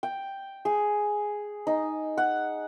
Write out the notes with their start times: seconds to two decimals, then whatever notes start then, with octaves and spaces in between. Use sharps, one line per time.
0.03 G5
0.65 G#4
1.67 D#4
2.17 F#5